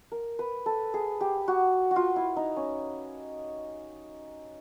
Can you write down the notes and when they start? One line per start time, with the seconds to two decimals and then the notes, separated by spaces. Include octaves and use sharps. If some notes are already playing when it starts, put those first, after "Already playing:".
0.12 A#4
0.39 B4
0.66 A4
0.94 G#4
1.21 G4
1.48 F#4
1.91 F#4
1.96 F4
2.16 E4
2.36 D#4
2.57 C#4